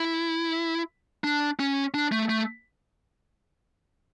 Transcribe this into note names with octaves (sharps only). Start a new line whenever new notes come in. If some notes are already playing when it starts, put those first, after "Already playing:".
Already playing: E4
D4
C#4
D4
A3
A3